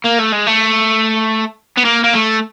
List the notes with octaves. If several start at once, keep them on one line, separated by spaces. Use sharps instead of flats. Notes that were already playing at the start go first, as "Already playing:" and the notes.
A#3
A3
G#3
A3
B3
A#3
A#3
A3